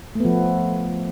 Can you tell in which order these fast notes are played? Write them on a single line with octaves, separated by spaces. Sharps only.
A3 B3 F3